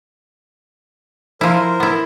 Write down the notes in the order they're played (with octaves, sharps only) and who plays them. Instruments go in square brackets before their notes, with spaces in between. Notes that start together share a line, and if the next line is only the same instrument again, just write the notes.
[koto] F3 E4 [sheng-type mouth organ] A#4 C5
[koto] B3 E4